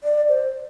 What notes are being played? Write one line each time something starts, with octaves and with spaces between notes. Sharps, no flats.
D5
C5